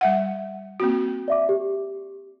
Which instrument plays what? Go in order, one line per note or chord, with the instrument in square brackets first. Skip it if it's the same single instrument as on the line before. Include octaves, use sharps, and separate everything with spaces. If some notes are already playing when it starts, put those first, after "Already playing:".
[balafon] G3 E5 F#5
A#3 C4 F#4
[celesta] D5 E5 D6
G4